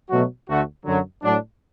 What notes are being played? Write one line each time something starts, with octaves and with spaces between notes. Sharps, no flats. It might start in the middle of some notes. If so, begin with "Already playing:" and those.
B2 F#3 A3 F#4
D2 D3 A3 F#4
F#2 D3 F#3
A2 F#3 D4